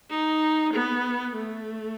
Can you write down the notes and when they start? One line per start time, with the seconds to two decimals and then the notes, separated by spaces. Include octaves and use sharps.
0.10 D#4
0.73 B3
1.35 A3